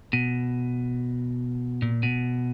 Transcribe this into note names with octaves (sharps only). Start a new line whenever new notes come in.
B2
A#2
B2